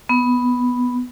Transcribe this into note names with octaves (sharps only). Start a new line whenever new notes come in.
B3